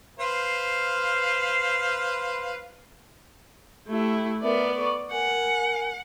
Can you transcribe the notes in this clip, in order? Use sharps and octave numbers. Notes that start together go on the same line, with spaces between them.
B4 C5 F5
A3 E4 G4
B3 A#4 D5 E5
A4 C#6 D6
A#4 F#5 G#5